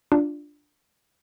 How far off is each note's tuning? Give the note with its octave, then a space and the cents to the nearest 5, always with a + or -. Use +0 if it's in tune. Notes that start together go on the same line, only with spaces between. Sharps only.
D4 +0 F4 +0